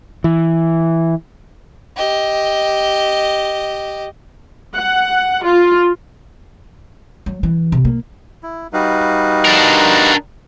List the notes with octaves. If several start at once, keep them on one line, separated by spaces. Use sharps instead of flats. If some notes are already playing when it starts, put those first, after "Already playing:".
E3
G4 D#5
F#5
F4
F#3
E3
C3
A#3
E4
G3 D#4 F#4 B4 F5
D4 A#4